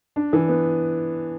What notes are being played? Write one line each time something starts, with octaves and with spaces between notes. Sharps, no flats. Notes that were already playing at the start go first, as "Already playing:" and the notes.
D4
E3
B3